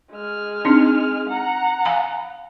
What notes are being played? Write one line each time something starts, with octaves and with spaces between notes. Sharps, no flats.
G#3 F6
C4 D4 D#4
F#5 A#5
F5 G#5 B5